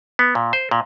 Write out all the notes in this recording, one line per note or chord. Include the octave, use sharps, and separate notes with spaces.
B3
A#2
C5
A#2